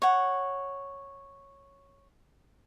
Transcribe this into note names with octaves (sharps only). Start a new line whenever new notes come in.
C#5 F#5